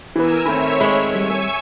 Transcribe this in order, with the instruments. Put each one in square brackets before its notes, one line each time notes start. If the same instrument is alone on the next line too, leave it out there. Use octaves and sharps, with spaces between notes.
[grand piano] E3 B3 [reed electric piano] E4 B4 [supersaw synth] A#4 G#5 E6
[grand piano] D#3 A3 C4 [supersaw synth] C#5 E5 [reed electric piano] B5
[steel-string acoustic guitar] G#3 [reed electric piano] B5 C#6
[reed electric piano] G3 [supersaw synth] G#5 C#6 E6